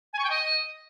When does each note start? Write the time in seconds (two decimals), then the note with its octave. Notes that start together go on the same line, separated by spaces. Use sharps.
0.13 G#5
0.18 C#6
0.24 G5
0.30 D#5